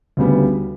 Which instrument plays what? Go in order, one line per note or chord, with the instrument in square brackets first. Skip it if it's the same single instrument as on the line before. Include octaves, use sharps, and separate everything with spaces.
[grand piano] D2 C#3 G3 B3